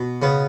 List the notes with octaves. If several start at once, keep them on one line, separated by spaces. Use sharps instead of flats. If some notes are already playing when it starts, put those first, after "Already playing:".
Already playing: B2
C#3 B3